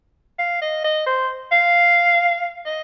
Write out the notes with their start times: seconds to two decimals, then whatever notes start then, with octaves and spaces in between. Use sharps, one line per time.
0.39 F5
0.62 D#5
0.84 D#5
1.07 C5
1.52 F5
2.66 D#5